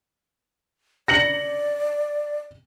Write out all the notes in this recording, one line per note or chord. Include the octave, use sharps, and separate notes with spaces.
D5 A#6 C#7 F#7